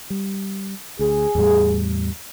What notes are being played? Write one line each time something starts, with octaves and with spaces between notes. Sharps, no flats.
G3
D2 G#4
E2 A2 G3